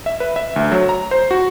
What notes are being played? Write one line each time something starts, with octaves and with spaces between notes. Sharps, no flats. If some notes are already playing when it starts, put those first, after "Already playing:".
E5
B4
E5
D2
F#3
A#5
C5
F#4